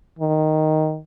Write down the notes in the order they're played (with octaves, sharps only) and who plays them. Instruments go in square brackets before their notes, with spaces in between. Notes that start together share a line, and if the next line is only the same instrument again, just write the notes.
[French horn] D#3